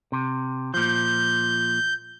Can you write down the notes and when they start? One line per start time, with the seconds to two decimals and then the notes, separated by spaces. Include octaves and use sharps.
0.12 C3
0.74 A#2 F3 G6